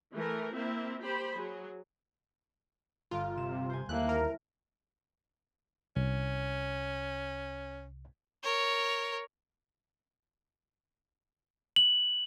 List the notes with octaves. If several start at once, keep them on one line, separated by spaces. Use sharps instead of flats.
E3 A3 A#4
A#3 C4 E4 E5
G4 C5 B5
F#3 G#4
G1 F4 D7
C3 E7
C5 G#5
D#2 A3 A#3 C4 E4 F#6
A#4
C2 C#4
A#4 C#5
F#7